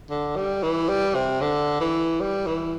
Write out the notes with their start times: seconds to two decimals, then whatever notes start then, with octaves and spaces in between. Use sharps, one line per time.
0.10 D3
0.36 G3
0.63 E3
0.89 G3
1.15 C3
1.41 D3
1.80 E3
2.21 G3
2.47 E3